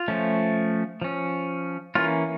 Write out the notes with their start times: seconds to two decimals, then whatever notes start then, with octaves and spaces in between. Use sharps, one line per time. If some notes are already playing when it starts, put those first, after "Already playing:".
Already playing: F4
0.08 F3 A3 C#4
1.02 F3 C#4
1.95 E3 A#3 C#4 F4